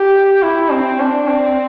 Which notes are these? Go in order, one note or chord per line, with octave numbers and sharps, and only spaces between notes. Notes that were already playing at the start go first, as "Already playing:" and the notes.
Already playing: G4
E4
C4
D4
C4